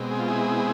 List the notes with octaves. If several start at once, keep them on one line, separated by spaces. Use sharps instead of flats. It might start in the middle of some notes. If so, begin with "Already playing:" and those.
Already playing: B2 G#3 C4
G#4
F4
E4 G#4